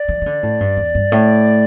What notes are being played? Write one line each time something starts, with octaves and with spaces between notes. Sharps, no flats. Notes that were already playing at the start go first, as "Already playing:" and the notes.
Already playing: D5
E3
E3
D3
A2
G2
E2
G2
A2